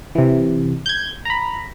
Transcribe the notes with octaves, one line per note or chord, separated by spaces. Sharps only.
C3 E3
G6 G#6
A#5 B5